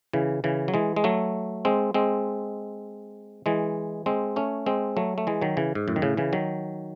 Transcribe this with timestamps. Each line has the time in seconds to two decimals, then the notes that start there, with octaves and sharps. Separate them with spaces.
0.13 C#3 E3
0.44 C#3 E3
0.68 F#3
0.74 E3 G#3
0.96 G#3
1.04 F#3 A3
1.65 G#3 C4
1.94 G#3 C4
3.46 E3 G#3
4.06 G#3 C4
4.36 A3 C#4
4.66 G#3 C4
4.97 F#3 A3
5.18 A3
5.27 E3 G#3
5.41 D#3 F#3
5.57 C#3 E3
5.75 G#2
5.88 F#2 A2
5.96 D#3
6.02 A2 C#3
6.17 C#3 E3
6.33 D#3 F#3